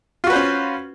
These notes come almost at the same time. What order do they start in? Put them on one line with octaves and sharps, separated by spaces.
F4 F#4 B4 C5 C#4